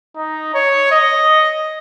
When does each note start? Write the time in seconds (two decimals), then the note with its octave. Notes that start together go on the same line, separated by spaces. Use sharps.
0.16 D#4
0.54 C#5
0.92 D#5